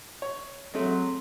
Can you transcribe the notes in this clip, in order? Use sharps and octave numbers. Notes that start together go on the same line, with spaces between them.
C#5
F#3 G#3 A3 C4 C#5 C6